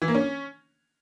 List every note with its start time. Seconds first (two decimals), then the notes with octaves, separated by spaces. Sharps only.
0.02 E3
0.08 A#3
0.15 C#4